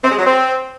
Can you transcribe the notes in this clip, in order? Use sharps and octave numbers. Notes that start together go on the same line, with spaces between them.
C4
G#3
F#3
C4